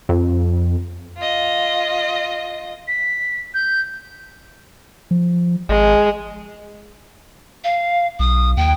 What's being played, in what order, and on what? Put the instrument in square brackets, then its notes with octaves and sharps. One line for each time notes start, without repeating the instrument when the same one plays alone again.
[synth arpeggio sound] F2
[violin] F4 D#5
[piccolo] B6
G6
[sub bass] F3
[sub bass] G#1 [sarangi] G#3
[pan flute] F5
[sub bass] B1 [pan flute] D#6
[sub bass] D#2 [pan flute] G5